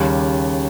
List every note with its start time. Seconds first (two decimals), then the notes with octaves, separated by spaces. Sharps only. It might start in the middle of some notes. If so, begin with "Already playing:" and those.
Already playing: D#2 C#3 G3 C#4